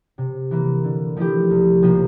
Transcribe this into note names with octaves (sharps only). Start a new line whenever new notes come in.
C3
E3 A#3
D3
F3 A3 E4 G4
C2
C3 F3 A#3 F4